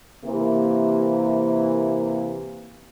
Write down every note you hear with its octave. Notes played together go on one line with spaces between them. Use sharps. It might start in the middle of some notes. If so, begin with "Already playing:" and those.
C3 E3 A#3